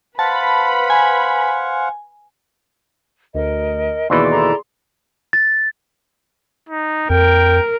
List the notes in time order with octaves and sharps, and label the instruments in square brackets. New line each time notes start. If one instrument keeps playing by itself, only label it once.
[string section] B4 B5 [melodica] C5 F5 F#5 [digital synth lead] A5
[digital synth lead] G#5
[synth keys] D2 [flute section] A#4 D#5
[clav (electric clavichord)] D#2 B2 E3 [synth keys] G#4 C6 [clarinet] D5 [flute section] B5 E6
[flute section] E4 A4 A#5
[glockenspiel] A6
[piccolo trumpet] D#4
[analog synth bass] F2 [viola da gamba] A#4 [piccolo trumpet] G5